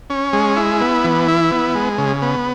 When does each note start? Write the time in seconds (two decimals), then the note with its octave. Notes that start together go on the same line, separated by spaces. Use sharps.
0.10 C#4
0.33 G#3
0.56 E4
0.81 B3
1.04 E3
1.28 E4
1.52 B3
1.75 G#3
1.98 C#3
2.22 B3